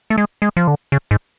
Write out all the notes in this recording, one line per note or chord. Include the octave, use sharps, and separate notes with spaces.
A3
G#3
G#3
F3
D3
C#3
G#2